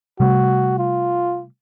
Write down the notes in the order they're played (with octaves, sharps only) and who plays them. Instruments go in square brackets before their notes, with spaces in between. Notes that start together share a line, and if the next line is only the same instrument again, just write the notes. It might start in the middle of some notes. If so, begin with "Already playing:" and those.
[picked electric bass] C3 G3 A3 [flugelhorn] F#4
[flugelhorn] F4